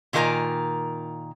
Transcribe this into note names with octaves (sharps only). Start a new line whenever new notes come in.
A#2 D#3 F4 A#4 G#5 A#5